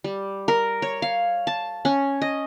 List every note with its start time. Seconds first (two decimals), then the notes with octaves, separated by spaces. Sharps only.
0.04 G3
0.48 A#4
0.82 C#5
1.02 F5
1.47 A5
1.85 C#4
2.22 D#5